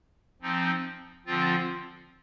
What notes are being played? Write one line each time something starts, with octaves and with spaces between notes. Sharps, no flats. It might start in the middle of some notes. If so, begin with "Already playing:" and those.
F3 C4 D#4
D3 F3 C4 F4